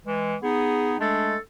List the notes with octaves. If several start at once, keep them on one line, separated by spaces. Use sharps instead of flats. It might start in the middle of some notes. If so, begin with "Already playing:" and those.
E3 G#3
B3 D#4 G#4
G#3 A3 D4 A4